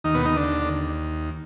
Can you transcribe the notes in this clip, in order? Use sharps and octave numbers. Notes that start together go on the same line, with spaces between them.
D#2 D#3 D#4
B2 B3
D#3 D#4
D3 D4